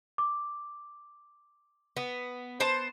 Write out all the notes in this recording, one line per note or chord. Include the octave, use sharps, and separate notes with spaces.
D6
B3
B3 C5 A5